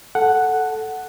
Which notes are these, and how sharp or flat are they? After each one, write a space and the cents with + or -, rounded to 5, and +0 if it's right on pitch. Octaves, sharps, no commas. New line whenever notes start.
A4 +0 F#5 +0